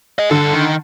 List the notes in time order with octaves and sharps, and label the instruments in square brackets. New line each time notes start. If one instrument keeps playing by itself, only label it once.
[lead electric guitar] G#4 D#5
[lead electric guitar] G2 A4 [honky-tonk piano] D3
[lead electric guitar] D#3